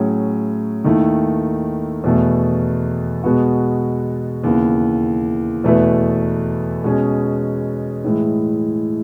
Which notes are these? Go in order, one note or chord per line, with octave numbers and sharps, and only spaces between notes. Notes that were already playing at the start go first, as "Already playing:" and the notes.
Already playing: A2 F#3 C#4 G#4
D#2 D#3 A3 E4
E2 B2 A3
B2 G#3 B3 F#4
D#2 C#3 E3 B3
E2 B2 A3 E4 B4
B2 G#3 C#4 G#4
A2 E3 G#3